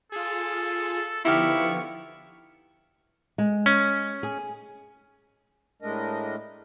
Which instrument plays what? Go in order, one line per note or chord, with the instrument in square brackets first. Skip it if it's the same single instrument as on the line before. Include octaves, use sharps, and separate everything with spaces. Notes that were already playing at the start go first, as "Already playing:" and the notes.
[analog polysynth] F4 G#4 [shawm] A4
[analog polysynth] D3 F3 B3 [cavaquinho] D#4 G4 F5 [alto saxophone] E4 [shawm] C#6
[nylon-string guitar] G#3
[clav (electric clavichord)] C#4
[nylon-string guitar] G#4
[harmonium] A2 G#3 A3 D4 A#4 D#5